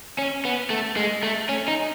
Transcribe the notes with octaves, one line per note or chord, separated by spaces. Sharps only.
C#4
B3
A3
G#3
A3
C#4
D#4